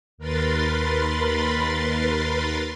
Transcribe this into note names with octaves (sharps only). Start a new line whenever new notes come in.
D#2 A#4 B4 B5 C6 A6